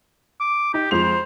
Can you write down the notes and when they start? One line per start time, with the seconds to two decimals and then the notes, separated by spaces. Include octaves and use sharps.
0.40 D6
0.74 D#4 G4
0.91 F2 G#3 C5 F7